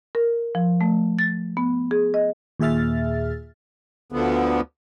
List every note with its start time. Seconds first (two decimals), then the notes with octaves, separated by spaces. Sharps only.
0.15 A#4
0.55 F3
0.81 A3
1.19 A6
1.57 B3
1.91 G#4
2.14 D#5
2.60 D#2 A#2 G#4 E5 F6 A6
4.12 D2 D3 F3 B3